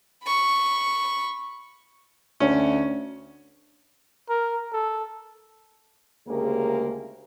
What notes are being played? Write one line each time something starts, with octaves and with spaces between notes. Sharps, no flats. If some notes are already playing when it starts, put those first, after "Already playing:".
B5 C#6
D2 C#4
A#4
A4
D2 C#3 G#3 A#3 G4 A#4